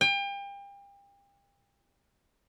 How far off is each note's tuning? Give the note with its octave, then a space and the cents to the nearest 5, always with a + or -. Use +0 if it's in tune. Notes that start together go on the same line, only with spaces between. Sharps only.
G5 +35